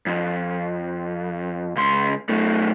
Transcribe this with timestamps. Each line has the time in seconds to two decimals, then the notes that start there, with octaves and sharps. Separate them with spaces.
0.07 F2
1.76 C#2 C6
2.29 F#2 A3